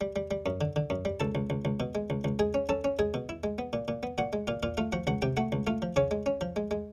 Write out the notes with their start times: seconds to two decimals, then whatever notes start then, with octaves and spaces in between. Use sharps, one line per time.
0.01 G3
0.16 G3
0.31 G3
0.46 F#2
0.61 D3
0.76 D3
0.90 F#2
1.05 G3
1.20 C#2 A4 A5
1.35 C#2
1.50 C#2
1.65 C#2
1.80 B2
1.95 G#3
2.10 C#2
2.24 C#2
2.39 G#3 G#4 G#5
2.54 C#4
2.69 C#4 A4 A5
2.84 C#4
2.99 G#3 G#4 G#5
3.14 B2
3.29 E4
3.44 G#3
3.58 B3
3.73 A#2
3.88 A#2
4.03 B3
4.18 A#2 F#4 F#5
4.33 G#3
4.47 A#2 F4 F5
4.63 A#2 F4 F5
4.77 A3 F4 F5
4.92 F3 F#4 F#5
5.07 C#2 F#4 F#5
5.22 C3 G4 G5
5.37 A3 F#4 F#5
5.52 C#2
5.67 A3 F4 F5
5.82 F3
5.96 C#3 C#4 C#5
6.11 G#3
6.26 C#4
6.41 F3
6.56 G#3
6.71 G#3